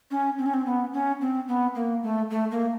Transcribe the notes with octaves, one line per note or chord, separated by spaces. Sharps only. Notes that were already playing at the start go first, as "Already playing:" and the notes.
C#4
C4
C#4
C4
B3
C#4
C4
B3
A#3
A3
A3
A#3